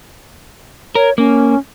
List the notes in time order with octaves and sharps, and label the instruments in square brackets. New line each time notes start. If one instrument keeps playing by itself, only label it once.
[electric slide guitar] A#4 [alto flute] C#5
[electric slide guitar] A#3 [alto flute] C#4